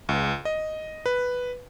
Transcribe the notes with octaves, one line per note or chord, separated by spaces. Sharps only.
C#2
D#5
B4